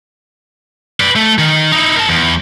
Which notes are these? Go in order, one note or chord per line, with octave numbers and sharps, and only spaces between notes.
B4 D5
A3
D#3
D#4 E4
A#4 A5
E2